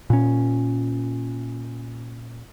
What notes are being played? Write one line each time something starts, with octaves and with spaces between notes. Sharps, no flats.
A#2 C#4